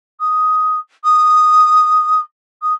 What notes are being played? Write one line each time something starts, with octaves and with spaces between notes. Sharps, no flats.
D#6
D#6
D#6